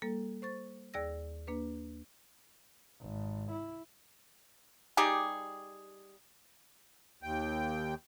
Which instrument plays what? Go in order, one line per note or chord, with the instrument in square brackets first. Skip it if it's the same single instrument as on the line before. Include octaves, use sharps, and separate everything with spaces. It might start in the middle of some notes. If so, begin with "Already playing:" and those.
[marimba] G3 A#3 A4
C5 C#6 A6
D#2 G#4 D5 E6 A#6
A#3 D4 B4
[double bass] G#1
E4
[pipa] G3 D#4 G4 G#4
[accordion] D#2 G5